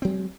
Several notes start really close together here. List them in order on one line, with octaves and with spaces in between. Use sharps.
C4 F#3 G#3